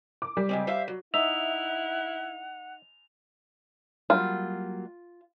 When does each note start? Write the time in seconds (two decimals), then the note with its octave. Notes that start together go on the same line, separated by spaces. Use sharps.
0.22 D6
0.37 G3
0.49 C#3 G#3 C4
0.67 C5 E5 F5
0.88 F#3
1.14 D#4 E4 E5 F#5 F7
4.10 F#3 G3 A#3 F4